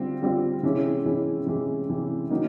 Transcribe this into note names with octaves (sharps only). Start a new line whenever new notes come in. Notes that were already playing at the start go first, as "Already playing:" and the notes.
Already playing: D3 G3 C4 F4
D3 G3 C4 F4
C3 E3 G#3 C#4 E4
C3 E3 G#3 C#4 E4
C3 E3 G#3 C#4 E4
C3 E3 G#3 C#4 E4
D#3 F#3 A#3 D#4